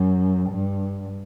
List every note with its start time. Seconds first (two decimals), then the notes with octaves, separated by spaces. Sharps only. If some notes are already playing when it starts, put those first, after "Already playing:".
Already playing: F#2
0.50 G2